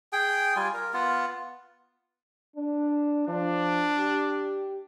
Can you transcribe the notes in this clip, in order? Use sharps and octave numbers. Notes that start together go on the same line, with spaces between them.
G#4 G5
G3 F4 G#5
A#4
B3 F4
D4
F3 D4
G4